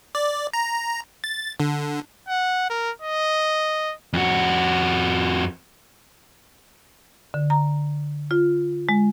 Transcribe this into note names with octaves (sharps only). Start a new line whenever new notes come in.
D5
A#5
A6
D3
F#5
A#4
D#5
F2 F#4
D3
A#5
F4
G#3